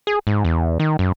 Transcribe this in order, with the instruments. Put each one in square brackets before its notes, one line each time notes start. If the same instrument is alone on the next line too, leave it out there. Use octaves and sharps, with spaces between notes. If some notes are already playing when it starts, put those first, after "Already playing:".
[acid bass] G#4
G#2
E2
D#3
F#2